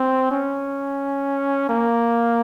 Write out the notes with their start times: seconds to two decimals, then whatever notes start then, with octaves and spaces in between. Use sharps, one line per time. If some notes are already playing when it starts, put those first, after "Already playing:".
Already playing: C4
0.31 C#4
1.69 A#3